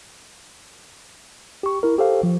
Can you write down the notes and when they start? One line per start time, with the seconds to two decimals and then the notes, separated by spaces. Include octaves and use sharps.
1.63 G4 C#6
1.83 E4 A#4
1.98 G4 A4 C5 F5
2.23 F3